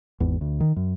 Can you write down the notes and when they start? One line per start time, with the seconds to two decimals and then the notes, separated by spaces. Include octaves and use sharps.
0.20 G#1 E2
0.41 D2
0.60 D#3
0.76 F#2